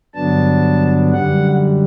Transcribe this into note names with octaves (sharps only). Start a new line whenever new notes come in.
G2 D3 F#3 B3 D4 A5
F#2 D3 G3 F#5